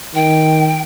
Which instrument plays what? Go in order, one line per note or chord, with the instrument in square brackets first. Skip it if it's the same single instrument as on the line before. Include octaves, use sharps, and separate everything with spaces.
[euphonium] D#3 [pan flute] G5